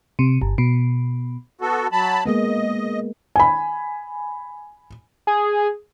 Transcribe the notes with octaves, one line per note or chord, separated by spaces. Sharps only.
C3
G1
B2
B3 F#4 A4
F#3 A5 B5
G#3 A#3 B3 D#5
G#5 B5
G#4